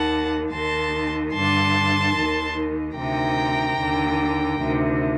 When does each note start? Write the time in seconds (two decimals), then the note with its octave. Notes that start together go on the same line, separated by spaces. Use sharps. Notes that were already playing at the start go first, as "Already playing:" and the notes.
Already playing: D#2 D#3 F#5 A5
0.52 D#2 D#3 A5 C6
1.33 G2 D3 A5 C6
2.15 D#2 D#3
2.96 D2 C3 D#3 G5 A#5
3.78 D#2 D3
4.60 D2 C3 D#3